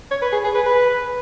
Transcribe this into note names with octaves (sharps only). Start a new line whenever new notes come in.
C#5
B4
G#4
G#4
B4
B4